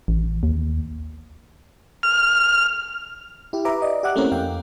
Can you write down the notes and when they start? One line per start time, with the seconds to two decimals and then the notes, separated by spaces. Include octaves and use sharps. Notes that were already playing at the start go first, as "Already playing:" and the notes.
0.08 A1
0.43 D#2
2.03 F6
3.53 E4 G4
3.65 B4 E5 A#5 B5 D6
3.82 D5 D#5
4.03 G4 E5 F#5 D6 F#6
4.16 A3 A#3 C4 C#4 E4 A#4
4.31 F2 F5 G5